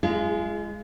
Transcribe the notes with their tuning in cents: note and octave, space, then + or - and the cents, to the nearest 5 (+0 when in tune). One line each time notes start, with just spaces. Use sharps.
G#3 +0 F4 -35 G#4 +20